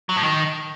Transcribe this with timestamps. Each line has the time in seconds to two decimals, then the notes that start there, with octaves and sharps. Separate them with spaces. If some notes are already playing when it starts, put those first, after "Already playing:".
0.09 F#3
0.16 A2
0.23 D#3